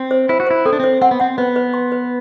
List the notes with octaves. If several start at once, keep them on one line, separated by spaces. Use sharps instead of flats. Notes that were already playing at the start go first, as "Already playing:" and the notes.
Already playing: C4
C5
E4 C5
F#4
E4 C5
C4 A4
D4
C4 C5
C4 F#5
B3
C4 F#5
B3 B4
B4
C6
B4